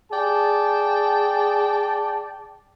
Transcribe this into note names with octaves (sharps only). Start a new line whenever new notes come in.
G#4 D5 G5 A5